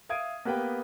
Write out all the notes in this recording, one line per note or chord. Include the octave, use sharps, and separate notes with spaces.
E5 F5 D#6 G#6 D7 D#7
A#3 B3 G4 B4 G5